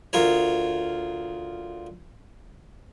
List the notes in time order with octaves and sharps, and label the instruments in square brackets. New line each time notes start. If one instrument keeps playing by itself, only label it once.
[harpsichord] D2 F4 A#4 C#5